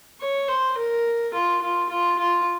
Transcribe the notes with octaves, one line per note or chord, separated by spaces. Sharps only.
C#5
C5
A#4
F4
F4
F4
F4